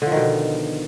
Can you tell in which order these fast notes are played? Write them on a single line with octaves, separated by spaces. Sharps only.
D3 F3 D#3 B2